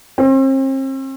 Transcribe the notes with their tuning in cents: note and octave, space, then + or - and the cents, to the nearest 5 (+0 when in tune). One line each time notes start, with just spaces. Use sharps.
C4 +40